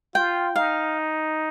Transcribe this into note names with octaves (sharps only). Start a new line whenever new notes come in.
F4 G5
D#4 F5